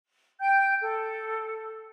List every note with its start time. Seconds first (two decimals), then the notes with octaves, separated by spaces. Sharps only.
0.40 G5 G6
0.82 A4